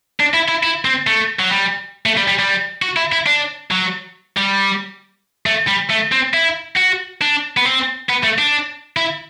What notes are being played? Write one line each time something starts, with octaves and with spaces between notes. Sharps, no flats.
D4
E4
E4
E4
C4
A3
F#3
G3
A3
G3
G3
G3
F#4
E4
E4
D4
F#3
G3
A3
G3
A3
C4
E4
F#4
D4
B3
C4
B3
A3
D4
E4